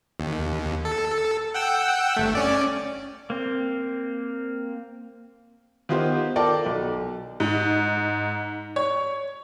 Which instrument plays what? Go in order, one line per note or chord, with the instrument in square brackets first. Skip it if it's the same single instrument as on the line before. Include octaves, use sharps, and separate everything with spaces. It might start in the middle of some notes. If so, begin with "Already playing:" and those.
[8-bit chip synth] D#2
A4
F#5 G5 E6
G1 A3
C#4 D5
[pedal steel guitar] A#3 C4
[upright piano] D#3 B3 F4 G4 C5
F4 A4 A#4 D5 G5
B1
[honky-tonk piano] G#2
C#5